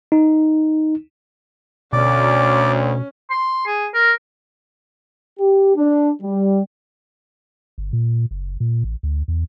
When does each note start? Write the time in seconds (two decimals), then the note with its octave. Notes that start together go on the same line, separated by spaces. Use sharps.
0.12 D#4
1.93 D2 B2 C#4 D5
3.30 C6
3.66 G#4
3.94 A#4
5.40 G4
5.76 D4
6.22 G3
7.78 G1
7.93 A#2
8.31 F#1
8.60 A#2
8.84 A1
9.03 D2
9.28 E2